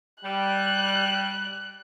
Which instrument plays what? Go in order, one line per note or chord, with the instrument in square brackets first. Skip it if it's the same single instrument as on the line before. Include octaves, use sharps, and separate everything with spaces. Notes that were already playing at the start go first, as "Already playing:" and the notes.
[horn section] G3 [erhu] F#6